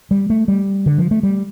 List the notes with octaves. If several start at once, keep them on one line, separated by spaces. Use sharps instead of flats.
G3
A3
G3
D3
F3
A3
G3